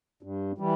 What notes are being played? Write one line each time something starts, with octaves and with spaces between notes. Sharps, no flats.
G2
E3 G3